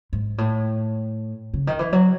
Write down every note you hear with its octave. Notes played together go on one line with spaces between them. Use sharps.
G#2
A2
C#3
D#3
E3
F#3